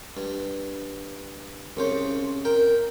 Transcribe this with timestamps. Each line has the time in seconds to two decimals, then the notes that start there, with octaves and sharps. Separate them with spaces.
0.17 G2
1.77 C2 C#3 C5
2.45 A#4 G5